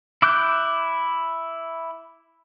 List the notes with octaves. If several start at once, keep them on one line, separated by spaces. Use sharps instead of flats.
E4 D6 F#6 G6